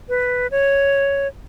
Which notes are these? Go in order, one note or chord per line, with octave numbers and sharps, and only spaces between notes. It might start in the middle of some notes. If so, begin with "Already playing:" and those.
B4
C#5